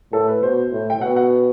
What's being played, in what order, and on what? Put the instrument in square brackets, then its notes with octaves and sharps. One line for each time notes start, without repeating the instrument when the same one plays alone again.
[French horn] A2 [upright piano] A4
[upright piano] B4
[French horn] B2 [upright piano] C5
[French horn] A2
[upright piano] G5
[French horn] B2 [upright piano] F#5
[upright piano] F#5